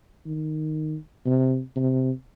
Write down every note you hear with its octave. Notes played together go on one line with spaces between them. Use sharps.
D#3
C3
C3